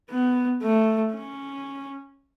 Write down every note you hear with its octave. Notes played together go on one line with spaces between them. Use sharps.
B3
A3
C#4